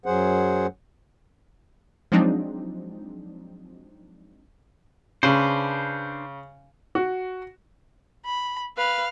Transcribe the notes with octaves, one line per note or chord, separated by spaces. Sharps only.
F#2 F#3 G#4 C5 F#5
F3 F#3 G#3 C4 D4 D#4
C#3 D4 B4 C5
F#4
B5
B4 F5